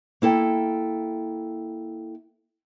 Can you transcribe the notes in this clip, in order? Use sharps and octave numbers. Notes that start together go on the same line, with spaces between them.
A#3 E4 A4 G5